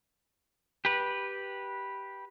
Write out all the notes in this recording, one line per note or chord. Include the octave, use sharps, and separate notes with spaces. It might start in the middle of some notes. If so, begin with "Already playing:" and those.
G4 B4